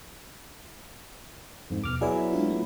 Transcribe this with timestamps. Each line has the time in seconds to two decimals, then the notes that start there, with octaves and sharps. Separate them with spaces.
1.70 F2 G#2
1.84 D#2 B2 D6 F6
2.01 F#3 B3 E4 G#4 D5 G#5
2.33 G#3 D4 F4
2.50 A3